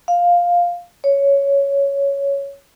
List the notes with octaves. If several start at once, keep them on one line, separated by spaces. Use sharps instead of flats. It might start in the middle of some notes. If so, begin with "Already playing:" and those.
F5
C#5